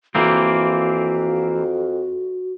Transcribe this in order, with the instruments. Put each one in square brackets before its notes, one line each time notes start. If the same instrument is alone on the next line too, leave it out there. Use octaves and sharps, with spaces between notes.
[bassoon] F2 [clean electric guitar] E3 A#3 C4 [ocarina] F#4